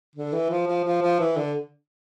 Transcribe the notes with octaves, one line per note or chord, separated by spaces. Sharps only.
D3
E3
F3
F3
F3
F3
E3
D3